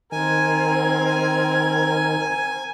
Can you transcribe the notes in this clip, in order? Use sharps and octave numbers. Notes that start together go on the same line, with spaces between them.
D#3 C4 A#4 G#5 G#6